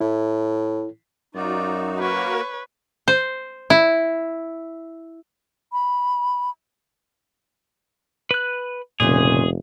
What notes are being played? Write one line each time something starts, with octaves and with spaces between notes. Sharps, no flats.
A2 E4
F#2 D#4 F4 F#4 D5
A#3 F#4 A#4 B4 C#5
C5
E4
B5
B4 F#6
F1 A#2 C#3 G#4